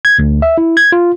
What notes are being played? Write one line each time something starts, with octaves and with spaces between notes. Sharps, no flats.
G#6
D2
E5
E4
G#6
F4